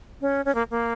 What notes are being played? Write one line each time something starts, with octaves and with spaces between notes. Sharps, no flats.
C#4
C#4
A#3
A#3